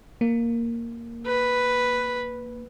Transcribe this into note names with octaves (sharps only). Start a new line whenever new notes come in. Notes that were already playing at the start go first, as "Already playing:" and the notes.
A#3
B4